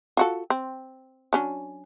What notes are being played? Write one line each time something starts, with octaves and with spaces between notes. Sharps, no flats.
F4 F#4 A4
C4
F#3 C#4 D4